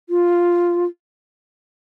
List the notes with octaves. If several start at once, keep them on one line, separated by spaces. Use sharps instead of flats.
F4